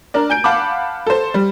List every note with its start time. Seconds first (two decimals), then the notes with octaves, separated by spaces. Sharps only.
0.14 D4 A#4 D5
0.30 G#5 G6 D7
0.44 F5 F#5 A5 B5 D6
1.07 A4 C5
1.34 G3